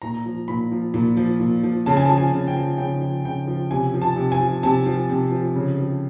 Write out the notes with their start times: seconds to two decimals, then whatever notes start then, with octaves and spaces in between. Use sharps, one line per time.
0.02 A#2 A#5
0.26 F3
0.48 A#2 B5
0.72 F3
0.94 A#2
1.17 F3
1.40 A#2
1.63 F3
1.86 C#3 A5
1.97 G#5
2.06 A5
2.09 F3
2.18 G#5
2.32 C#3
2.48 G5
2.56 F3
2.78 C#3 G5
3.01 F3
3.25 C#3 G5
3.48 F3
3.71 C3 G#5
3.94 F3
4.02 A5
4.16 C3
4.32 G#5
4.39 F3
4.63 C3 A5
4.86 F3
5.09 C3
5.31 F3
5.56 C#3
5.79 F3